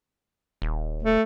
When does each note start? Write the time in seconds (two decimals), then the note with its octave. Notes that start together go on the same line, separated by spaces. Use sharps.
0.62 D#1
1.03 A3